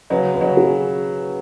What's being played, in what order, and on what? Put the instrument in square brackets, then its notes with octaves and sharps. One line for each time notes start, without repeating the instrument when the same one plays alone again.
[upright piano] C#3 F#3 [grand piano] B4
[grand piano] B4
[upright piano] C#3 F#3
[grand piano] G#4